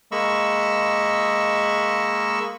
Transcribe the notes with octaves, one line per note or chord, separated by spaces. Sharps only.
G#3 A#3 D#5 B5 C#6 E6